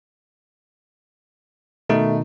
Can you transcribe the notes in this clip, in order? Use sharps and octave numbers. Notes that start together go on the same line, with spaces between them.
B2 D#3 A3 D#4